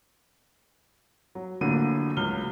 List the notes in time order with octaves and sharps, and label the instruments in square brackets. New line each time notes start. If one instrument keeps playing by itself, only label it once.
[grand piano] F#3
A#1 A2 D3 F#3 A#3 D#7
C#2 F#3 F6 G7